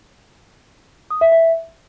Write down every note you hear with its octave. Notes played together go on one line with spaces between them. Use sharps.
D#6
E5
E5